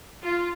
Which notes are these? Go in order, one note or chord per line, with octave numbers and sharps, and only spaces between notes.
F4